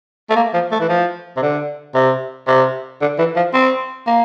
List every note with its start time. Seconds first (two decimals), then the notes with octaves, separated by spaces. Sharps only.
0.30 A3
0.36 A#3
0.54 F3
0.72 A3
0.80 E3
0.89 F3
1.37 C3
1.42 D3
1.95 C3
2.48 C3
3.01 D3
3.19 E3
3.36 F3
3.54 C4
4.07 A#3